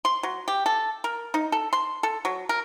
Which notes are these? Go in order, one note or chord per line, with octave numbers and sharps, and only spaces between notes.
C6
F#3
G4
A4
A#4
D#4
A4
C6
A4
F#3
A#4